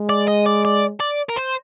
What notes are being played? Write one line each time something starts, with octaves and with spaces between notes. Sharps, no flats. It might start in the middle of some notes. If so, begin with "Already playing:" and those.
Already playing: G#3
D5
D#5
D5
D5
D5
A#4
C5